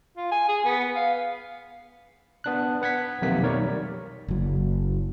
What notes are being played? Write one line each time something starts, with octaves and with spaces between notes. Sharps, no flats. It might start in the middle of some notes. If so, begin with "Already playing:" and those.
F4
G#5
G#4
B3
F5
B3 D4 F#6
B4 F#5 G#6 B6
B1 F2 C3 D#3 A#3 B6
B1 G3 A#4 C#5 D5
F#1 F#3